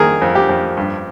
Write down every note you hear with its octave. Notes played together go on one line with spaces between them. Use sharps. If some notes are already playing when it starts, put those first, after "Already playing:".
Already playing: F2 D#3 G#4 A#4
F2
G4
F2
G2